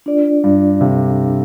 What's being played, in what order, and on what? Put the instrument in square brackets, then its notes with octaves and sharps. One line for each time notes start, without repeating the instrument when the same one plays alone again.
[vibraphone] D4 F4 D5
[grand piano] G2
[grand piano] C3 [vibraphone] D4 A4 F5